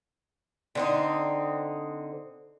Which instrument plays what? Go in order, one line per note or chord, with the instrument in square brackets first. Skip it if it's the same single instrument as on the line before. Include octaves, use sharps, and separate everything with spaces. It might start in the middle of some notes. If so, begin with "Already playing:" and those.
[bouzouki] D3 C4 D#4